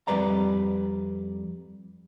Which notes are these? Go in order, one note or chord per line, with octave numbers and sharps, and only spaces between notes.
F2 G#2 G3 B4 D5 A#5